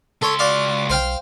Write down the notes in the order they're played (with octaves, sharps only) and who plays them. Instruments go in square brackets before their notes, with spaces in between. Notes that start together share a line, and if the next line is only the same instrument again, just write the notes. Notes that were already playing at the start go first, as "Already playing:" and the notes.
[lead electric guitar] C#2 C6 [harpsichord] A4 C#5
[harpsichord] F#4 D5 F5
[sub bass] B1 [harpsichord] C5 F5 G5